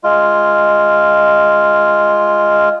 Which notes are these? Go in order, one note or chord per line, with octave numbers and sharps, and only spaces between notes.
G#3 F4